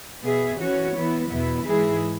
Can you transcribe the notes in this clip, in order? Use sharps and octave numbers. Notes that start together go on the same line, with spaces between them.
B2 B3 G#4 E5
E3 C#4 F#4 C#5
E3 B3 E4
E2 B2 B3 E4
G#2 E3 G#3 E4 G#4